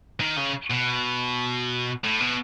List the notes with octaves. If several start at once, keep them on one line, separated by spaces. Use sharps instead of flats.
D#3
C#3
B2
A2
B2